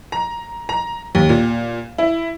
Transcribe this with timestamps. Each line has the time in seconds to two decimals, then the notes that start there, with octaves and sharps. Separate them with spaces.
0.12 A#5
0.69 A#5
1.15 D#2
1.29 A#2
1.98 E4